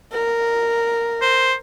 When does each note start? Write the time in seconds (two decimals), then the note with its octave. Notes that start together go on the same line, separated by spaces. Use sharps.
0.12 A#4
1.21 C5